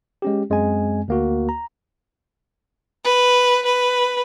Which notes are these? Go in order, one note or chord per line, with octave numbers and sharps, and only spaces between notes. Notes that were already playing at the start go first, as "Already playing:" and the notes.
G#3 C#4 G4
F#2 G#3 C4 G#5
D2 A#3 F#4
A#5
B4
B4